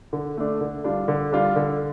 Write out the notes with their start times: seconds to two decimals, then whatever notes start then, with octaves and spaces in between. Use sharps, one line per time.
0.13 D3
0.37 A3 D4
0.61 D3
0.84 G3 D4 F4
1.08 D3
1.32 G3 D4 F4
1.56 D3